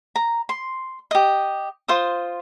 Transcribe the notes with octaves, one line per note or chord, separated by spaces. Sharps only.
A#5
C6
G4 D#5
F4 C5 C6 D#6